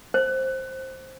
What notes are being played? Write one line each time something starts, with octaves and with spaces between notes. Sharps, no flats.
C5